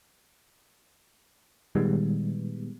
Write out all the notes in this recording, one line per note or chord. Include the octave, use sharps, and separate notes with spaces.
A#2 D#3 G3 G#3 B3